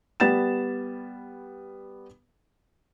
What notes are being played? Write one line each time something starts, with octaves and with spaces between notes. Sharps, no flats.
G3 B3 A6 E7